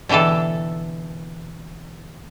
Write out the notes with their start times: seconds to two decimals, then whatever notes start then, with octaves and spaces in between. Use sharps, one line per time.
0.09 B2 D3 E3 G4 A4